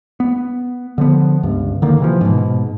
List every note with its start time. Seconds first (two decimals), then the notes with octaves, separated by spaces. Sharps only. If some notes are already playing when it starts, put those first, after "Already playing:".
0.20 B3
0.98 D3 F3 B3
1.43 C#2 G2
1.82 D3 D#3 A#3
2.00 C3 E3 F3
2.21 G#2 B2